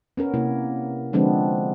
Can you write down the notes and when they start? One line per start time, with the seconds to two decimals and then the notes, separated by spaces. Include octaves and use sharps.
0.17 B3 C#4 A#4
0.34 C3 A#3 E4
1.13 D3 F3 G#3 B3 C4 D4